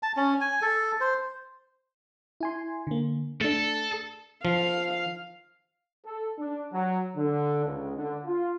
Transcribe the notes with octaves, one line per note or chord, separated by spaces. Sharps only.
A5
C#4
G#5
A4
C5
E4 G#5 C6
D3 A#3
A3 D4 A4
F3 F5
A4
D4
F#3
D3
C#2
D3
F4